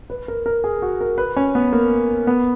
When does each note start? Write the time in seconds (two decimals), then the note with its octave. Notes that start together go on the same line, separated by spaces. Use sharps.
0.10 B4
0.28 A#4
0.46 A#4
0.64 G#4
0.82 F#4
1.01 A#4
1.18 B4
1.36 C#4
1.55 B3
1.73 A#3
2.27 B3